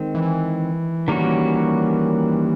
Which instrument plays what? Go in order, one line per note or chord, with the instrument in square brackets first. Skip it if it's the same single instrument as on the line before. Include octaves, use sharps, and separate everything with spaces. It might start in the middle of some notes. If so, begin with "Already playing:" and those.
Already playing: [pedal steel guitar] D#3 G#3 C4
[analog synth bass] E3
[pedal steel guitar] D#3 G3 A#3 C#4 F#4